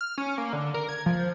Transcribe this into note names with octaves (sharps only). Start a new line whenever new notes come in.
F6
C#4
A#3
D3
A#4
G#6
F3